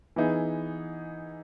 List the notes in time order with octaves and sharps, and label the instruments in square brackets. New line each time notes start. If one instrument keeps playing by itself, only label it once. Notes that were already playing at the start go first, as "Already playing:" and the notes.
[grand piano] E3 B3 D#4 G#4